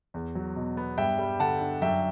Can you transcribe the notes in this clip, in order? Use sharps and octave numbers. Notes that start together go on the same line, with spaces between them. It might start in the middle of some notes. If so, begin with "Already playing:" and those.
E2
F#3
B2
B3
G2 E5 G5
G3
D3 F#5 A5
D4
F#2 E5 G5